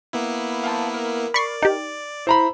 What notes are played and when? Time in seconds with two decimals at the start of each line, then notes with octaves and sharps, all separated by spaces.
0.13 A#3 B3 E4
0.63 F5 G5 A5
0.94 A#4
1.34 D5 B5 C#6 C7
1.63 D#4 G4
2.27 E4 C5 A#5 B5